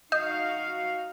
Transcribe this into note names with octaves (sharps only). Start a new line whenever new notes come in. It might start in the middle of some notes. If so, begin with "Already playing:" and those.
D#4 F#4 D#5 F5 G6